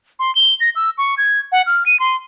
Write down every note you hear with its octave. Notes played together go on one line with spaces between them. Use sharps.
C6
G7
A#6
E6
C#6
G#6
F#5
F6
D#7
C6